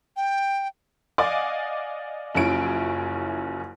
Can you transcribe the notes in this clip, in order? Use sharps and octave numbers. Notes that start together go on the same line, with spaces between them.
G5
D5 D#5 F5 F#5 G#5 D6
F#1 F#2 F3 C#4 E4 D7